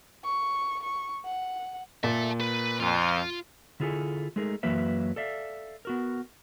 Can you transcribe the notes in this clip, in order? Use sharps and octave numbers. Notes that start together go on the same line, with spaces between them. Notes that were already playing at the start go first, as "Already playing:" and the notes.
C#6
C#6
F#5
A#2 E5 A5
B4
F2 F4
D3 E4 F4 G#4 A4 G#5
G#3 A3 D#4 G#4 A#4
F#2 E3 F#3 A#3 B4 E5
A4 D5 E5 F5
B3 F#4 A#4